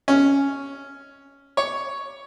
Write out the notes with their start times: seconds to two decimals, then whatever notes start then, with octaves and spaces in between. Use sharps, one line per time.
0.08 C#4
1.57 C#5